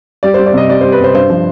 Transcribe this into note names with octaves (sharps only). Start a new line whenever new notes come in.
G3 D5
C5
G3
D5
C3 D#5
G3 D5
G3 C5
B4
C3 C5
G2 C5
F3